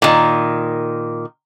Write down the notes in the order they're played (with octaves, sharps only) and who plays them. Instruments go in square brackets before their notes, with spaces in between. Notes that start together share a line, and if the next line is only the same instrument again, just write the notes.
[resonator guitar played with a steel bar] A#2 D#3